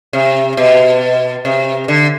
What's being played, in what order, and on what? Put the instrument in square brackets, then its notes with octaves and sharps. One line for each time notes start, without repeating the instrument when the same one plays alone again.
[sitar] C3
B2
C3
D3